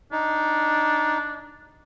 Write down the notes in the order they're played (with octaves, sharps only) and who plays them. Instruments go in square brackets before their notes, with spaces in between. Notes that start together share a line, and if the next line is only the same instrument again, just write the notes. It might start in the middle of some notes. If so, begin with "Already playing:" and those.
[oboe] D4 [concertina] D#4